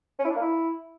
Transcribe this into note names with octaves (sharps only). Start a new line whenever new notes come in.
C#4
E4
D4
A#3
E4